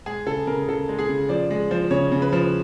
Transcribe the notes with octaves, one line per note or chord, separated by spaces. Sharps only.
G#3 G#4
C#3 A4
C#3 A#4
C#3 A4
G#3
G#4
C#3
F3 D5
G#3
F3
C#3 C#5
C#3
B4
F3